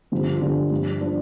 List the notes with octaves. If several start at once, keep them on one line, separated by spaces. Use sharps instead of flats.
G2 D3 F3
F4
G2 D3 F3 D4
G2 F3
F3 D4